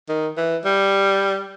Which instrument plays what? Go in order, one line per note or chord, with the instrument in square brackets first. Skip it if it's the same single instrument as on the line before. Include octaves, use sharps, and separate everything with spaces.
[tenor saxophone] D#3
E3
G3